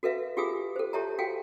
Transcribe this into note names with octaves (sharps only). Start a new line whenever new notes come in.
F#4 A4 B4 E5 F5
F4 G4 G#4 F5 G#5 D#6
A4 C5
G4 A4 C#5 E5 A5 A#5
F#4 A4 F5 G5 G#5